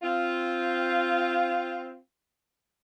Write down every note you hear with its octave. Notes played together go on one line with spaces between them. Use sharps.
C4 F4